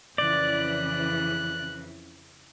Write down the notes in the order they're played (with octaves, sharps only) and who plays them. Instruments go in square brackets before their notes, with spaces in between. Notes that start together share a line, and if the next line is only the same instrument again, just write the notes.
[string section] F2 C#3 E3 [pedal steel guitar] D5 [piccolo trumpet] F#6